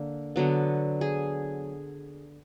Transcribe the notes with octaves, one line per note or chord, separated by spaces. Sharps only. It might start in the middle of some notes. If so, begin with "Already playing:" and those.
Already playing: D3 A#3
D3 F#3 B3
G#4